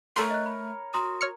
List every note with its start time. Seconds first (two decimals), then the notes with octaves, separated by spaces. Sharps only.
0.16 A3 A4 A#4 C#5 C6
0.30 D#5 F#6
0.46 B5
0.94 F#4 A#5 C6 D#6
1.21 C#5 F6 C#7